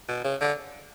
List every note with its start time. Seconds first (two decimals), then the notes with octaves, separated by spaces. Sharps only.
0.09 B2
0.24 C#3
0.41 D3